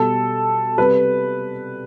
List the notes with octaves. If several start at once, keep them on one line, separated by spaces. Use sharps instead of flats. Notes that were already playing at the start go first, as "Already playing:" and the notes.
Already playing: B2 G3 A4
C3 G3 B4